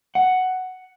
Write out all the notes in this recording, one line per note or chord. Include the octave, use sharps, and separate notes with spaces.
F#5